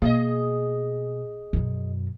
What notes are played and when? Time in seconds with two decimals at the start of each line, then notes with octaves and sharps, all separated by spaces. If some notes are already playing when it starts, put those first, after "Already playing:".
0.02 B2 A#3 G#4 D5 D#5
1.53 F#2 B2